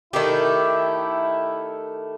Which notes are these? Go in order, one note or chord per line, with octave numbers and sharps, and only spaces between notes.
D#3 A3 E4 G4